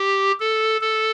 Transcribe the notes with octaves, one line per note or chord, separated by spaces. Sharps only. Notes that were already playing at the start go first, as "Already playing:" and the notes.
Already playing: G4
A4
A4